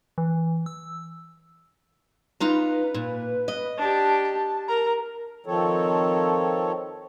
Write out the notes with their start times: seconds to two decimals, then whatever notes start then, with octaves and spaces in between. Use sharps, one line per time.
0.18 E3
0.66 E6
2.40 D#4 F4 B4 A#5
2.94 A#2
3.48 D#5
3.78 D4 G4 A5
4.24 A5
4.68 A#4 A#5
5.46 D#3 F3 C4 A4 C#5